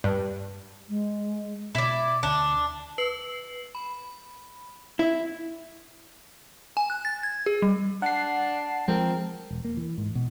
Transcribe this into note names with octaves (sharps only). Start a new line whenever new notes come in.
G2
G#3
B2 E4 D5
D2 D4
B4 C7 F#7
B5
E4
G#5
F#6
A6
G#6
G#4
G3
D4 F#5 A5 C7
F3 G#3 C4 A#4
E1
A#3
E3
G#2
B2